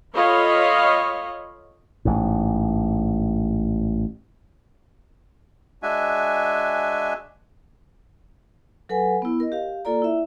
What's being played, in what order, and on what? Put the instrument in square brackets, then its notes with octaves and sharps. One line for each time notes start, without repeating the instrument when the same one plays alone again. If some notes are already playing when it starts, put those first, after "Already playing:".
[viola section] F4 A4 C#5 D#5 F5 B5
[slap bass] A1 G#2
[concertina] G#3 D4 F#4 E5 G#5
[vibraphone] F#3 A4 B4 F#5 G#5
B3 E4
A#4 D#5
G4 F5
A#3 F4 A4 D5 A#5
E4 E5